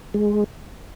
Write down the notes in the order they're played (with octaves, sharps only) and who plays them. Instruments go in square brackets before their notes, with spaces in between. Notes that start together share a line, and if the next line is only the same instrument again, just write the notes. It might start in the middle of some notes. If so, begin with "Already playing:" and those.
[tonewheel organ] G#3